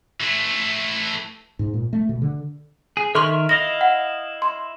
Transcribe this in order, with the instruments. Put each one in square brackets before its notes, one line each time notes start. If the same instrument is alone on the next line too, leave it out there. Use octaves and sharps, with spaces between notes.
[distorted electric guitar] E3 A3
[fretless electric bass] G#2
A#2
A3
B2
D3
[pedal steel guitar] G#4
[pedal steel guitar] D#3 E5 F6 [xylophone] A4 C6 C#6
[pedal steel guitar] E4 D#5 F5 [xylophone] A#6
[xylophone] F#5
C6